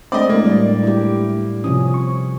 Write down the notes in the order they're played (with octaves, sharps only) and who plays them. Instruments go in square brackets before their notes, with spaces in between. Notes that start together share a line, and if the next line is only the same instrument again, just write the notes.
[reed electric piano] G#3 A3 D4 [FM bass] C4 [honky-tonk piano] D5 D#5
[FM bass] A2 [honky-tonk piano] A#3
[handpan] G3 D5
E4 G4
[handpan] C3 F3 C#4 [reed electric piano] D#6
[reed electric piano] C#6